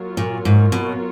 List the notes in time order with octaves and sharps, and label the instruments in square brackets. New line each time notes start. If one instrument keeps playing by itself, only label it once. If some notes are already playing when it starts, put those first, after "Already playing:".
Already playing: [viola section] F#3 A#3 F4 A#4 C#5
[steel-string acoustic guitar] A#2
G#2
B2